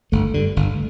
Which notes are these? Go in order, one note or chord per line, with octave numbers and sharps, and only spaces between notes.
G1 A3
G2 D3
G1